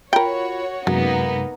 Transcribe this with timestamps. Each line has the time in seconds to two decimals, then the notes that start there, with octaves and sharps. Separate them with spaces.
0.13 F4 F#4 A#4 C#5 G5 B5
0.87 F#2 C3 F#3 G#3 A#3 B3 D#4